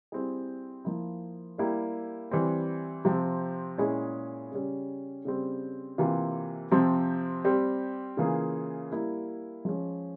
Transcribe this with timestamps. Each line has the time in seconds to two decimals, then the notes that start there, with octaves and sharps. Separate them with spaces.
0.12 G3 C4 E4 G#4
0.85 F3 A#3 E4
1.58 G3 A#3 E4 G4
2.31 E3 G3 C4
3.05 C3 F3 C4
3.78 A#2 G#3 C#4 E4 G#4
4.52 C#3 G3 C#4
5.25 C#3 G3 C4
5.98 C3 E3 A#3 F4
6.71 C3 F3 C4
7.44 G3 C4 G4
8.17 C#3 E3 A#3 F4 G#4
8.91 G3 A#3 E4
9.65 F3 G#3 C#4